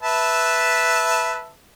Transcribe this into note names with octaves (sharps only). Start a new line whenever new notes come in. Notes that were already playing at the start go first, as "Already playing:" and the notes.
B4 E5 A5